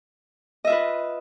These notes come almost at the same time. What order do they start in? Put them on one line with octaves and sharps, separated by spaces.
D#5 E5 F4 B4